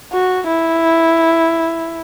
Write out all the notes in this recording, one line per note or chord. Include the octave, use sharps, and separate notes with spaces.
F#4
E4